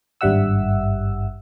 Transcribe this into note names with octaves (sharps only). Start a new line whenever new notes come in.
G#1 G2 G3 E5 F#5 E6